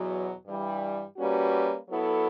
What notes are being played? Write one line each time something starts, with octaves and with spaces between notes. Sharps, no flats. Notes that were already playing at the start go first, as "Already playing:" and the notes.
Already playing: E2 B2 F#3
G2 E3 G3
G3 A#3 C#4 F#4 B4
F#3 B3 E4 A4